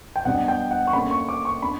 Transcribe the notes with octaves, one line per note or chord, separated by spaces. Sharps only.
G5
B2 G3 B3 D4 F#5
G5
F#5
C#6
D3 A#3 C#4 B5
C#6
D6
C#6
B3 D4 B5